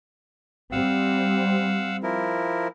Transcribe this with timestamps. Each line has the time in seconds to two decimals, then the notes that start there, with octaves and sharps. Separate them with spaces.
0.72 G3 C4 F5 F#5 E6
2.03 F3 E4 A#4